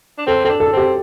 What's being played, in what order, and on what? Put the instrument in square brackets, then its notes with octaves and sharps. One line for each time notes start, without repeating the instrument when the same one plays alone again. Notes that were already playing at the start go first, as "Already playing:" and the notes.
[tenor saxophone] D4
[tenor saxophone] C4 [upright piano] A4
[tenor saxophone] C4 [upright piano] A4
[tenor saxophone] D4
[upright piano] A4
[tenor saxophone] C4 [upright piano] G4